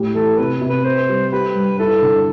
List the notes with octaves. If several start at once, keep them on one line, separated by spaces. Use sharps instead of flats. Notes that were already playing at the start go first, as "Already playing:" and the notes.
Already playing: A2 G4
E3 A4
C3 B4
C3
B4
B4 C5
G3
G4 B4
G2
E4 A4
D3